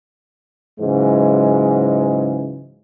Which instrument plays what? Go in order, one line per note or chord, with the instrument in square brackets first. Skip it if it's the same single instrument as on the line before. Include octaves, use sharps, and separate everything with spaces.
[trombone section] G#2 C#3 E3 F#3 G#3